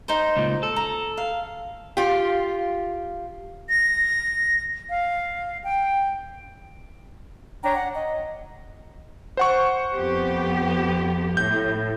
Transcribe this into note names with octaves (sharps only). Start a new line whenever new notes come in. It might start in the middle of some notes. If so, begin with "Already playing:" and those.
D#4 C5
C#2 A#2
A4
A#5
F5
F4 G4
A#6
F5
G5
D4 C#5 G5 A#5
F#5
D#5
C5 F#5 C#6
F2 B3 G4
A2 G6